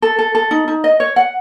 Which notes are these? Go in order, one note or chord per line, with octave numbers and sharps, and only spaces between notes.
A4
A4
A4
D#4
D#4
D#5
C#5
F#5